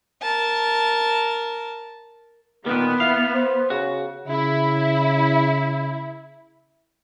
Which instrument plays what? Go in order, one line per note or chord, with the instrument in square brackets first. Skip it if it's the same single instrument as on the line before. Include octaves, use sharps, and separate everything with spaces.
[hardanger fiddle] A#4 A5
[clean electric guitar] A#2 D#3 [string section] B3
[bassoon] E4 [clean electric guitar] F5
[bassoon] C5
[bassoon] C#3 [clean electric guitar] F#4
[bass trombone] C#3 [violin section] E4